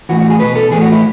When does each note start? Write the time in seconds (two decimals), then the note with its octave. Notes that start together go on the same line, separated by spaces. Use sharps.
0.09 A2 E3 F#4
0.20 F#4
0.30 G#4
0.40 B2 B4
0.55 A4
0.71 A2 E3 G#4
0.81 F#4
0.92 E4